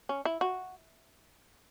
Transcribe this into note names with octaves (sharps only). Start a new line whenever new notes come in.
C#4
E4
F#4